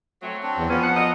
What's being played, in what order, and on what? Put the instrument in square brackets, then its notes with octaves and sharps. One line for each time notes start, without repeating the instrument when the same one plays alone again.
[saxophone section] F#3 [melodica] A3 C4
[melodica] C4 D4
[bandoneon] E2
[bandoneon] F3 B3 [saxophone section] C#4
[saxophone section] F#5
[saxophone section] A3 F#4 D#5 [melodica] A#5